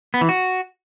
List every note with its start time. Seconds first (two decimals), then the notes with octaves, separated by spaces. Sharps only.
0.14 B3
0.21 E3
0.29 F#4